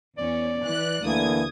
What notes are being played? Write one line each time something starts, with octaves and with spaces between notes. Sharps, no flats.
E2 C#4 D5
E3 F#6
D2 D3 E3 A#3 D#6 G#6